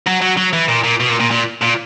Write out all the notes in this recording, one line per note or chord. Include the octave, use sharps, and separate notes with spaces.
F#3
F#3
F#3
E3
A#2
A#2
B2
A#2
A#2
A#2
A#2